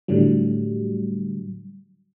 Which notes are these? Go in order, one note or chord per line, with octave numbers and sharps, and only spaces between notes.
A2 D3 F#3 G3